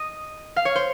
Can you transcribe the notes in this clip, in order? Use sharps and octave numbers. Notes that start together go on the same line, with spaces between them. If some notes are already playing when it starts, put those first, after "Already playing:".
Already playing: D#5
F5
C#5
C5